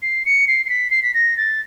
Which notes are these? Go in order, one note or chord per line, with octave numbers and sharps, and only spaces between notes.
C7
C#7
C7
C7
B6
C7
B6
A#6
A6